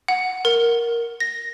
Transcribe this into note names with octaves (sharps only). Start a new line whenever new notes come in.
F#5
A#4
A#6